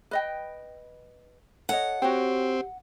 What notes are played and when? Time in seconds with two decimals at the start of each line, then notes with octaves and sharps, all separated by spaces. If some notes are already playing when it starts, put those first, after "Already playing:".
0.11 B4 D#5 G5
1.69 A4 C#5 D#5 F#5
2.02 C4 F#4 G4 C#5 G5